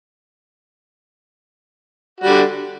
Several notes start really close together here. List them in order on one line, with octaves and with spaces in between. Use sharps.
F#4 G3 D3